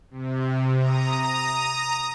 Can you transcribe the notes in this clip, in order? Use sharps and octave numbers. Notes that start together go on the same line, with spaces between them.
C3
A#5 D#6